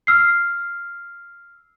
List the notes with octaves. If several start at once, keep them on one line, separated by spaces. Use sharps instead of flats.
E6 F6 C7